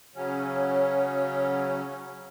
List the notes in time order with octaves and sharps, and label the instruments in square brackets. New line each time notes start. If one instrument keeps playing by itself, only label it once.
[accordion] C#3 F#3 C#4